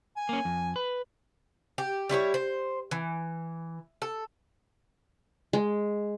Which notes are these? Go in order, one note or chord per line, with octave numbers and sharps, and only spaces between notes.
G#5
A#3 C#4
F2
B4
G4
G3 E4 F4 C#5
C5
E3
A4
G#3